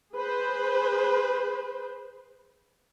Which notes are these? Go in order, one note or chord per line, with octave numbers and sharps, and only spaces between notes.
G#4 B4 C5